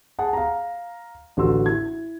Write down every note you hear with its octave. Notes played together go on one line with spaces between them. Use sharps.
G#4 F#5 A5
F5 A#5
A1 D3 F#4 C6 E6
E4 G#6